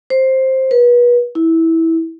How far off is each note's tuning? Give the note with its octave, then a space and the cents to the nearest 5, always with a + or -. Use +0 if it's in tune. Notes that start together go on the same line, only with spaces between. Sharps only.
C5 +10
B4 -35
E4 -15